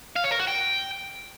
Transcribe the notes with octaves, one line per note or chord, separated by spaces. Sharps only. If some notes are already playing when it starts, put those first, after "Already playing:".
F5
C#5
A#4
F#4
G5